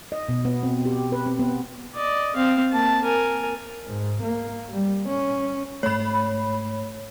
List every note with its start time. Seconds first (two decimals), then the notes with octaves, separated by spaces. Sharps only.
0.12 D#5
0.29 B2
0.45 B3
0.63 C4
0.85 G4
1.12 B4
1.26 C4
1.39 B3
1.95 D5 D#5
2.36 C4 F5
2.72 A#3 A5
3.04 A#4 G#5
3.87 G#2
4.22 A#3
4.70 G3
5.09 C#4
5.83 G#2 A3 C#5 B5